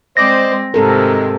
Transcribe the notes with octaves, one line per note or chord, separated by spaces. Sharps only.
G#3 C4 C5 D5 D#5 A#6
G#2 C3 D#3 G#3 C4 A4 A#4